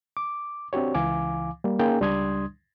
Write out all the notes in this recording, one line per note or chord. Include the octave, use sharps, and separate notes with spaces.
D6
C4 D4 F#4 G4 C#5
C#2 E3 F5 G#5 D6
G3 A#3
A#3 C#4 D#4 G#4 G5
C#2 G3 D4 C6 D#6 G#6